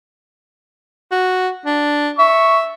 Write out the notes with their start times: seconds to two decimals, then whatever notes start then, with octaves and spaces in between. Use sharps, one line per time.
1.11 F#4
1.66 D4
2.19 E5 C#6